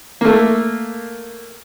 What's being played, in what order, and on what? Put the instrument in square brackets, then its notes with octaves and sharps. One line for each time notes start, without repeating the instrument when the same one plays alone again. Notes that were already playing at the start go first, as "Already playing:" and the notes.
[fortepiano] A3 A#3